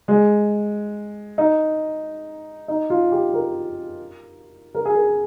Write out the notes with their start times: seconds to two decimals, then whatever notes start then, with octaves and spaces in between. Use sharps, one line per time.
0.08 G#3
1.38 D#4
2.68 D#4
2.90 F4
3.12 G4
3.34 A#4
4.75 A#4
4.85 G#4
4.95 A#4